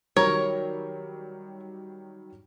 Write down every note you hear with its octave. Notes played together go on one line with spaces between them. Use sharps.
D#3 F#3 G3 A#4 C#5